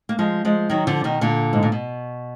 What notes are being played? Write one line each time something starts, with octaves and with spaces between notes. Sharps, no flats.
A#3
F3 G#3
F3 G#3
D#3 F#3
D3 F3
B2 D#3
A#2 D3
G#2
A#2
B2